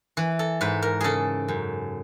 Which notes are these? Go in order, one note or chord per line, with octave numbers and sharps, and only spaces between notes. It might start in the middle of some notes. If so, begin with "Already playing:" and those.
E3
A4
G#2 B4
A#4
C#3 G#4 A4
F#2